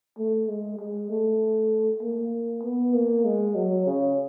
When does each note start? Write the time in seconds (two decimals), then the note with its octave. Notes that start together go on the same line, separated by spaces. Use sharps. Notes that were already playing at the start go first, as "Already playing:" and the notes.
0.18 A3
0.48 G#3
0.79 G#3
1.10 A3
2.02 A#3
2.63 B3
2.94 A#3
3.25 G#3
3.55 F#3
3.86 C#3